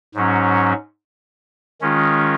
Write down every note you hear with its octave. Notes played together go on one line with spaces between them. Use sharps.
G#2 F#3 C#4
D#3 G#3 C#4 F4